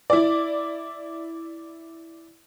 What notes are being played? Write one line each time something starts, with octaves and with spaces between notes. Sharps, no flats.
E4 D5